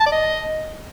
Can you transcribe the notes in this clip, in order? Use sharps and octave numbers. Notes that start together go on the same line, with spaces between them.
A5
D5
D#5